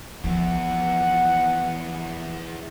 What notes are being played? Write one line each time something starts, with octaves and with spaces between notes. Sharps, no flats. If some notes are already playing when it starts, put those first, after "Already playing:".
E2 E3 F3 F#5